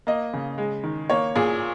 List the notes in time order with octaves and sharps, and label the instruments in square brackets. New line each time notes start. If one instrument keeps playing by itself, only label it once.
[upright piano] A#3 D#5
C#3
G#3
D#3
A#3 C#5
A#2 G#4